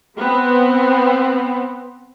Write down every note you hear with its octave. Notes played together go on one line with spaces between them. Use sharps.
B3 C4